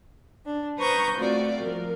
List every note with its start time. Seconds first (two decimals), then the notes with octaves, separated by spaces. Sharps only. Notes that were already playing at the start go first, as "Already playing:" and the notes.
0.45 D4
0.78 B4 C5 A#5 C#6 D#6 G6
1.17 A3 C4 F4 F#4 D5
1.59 F3 A#4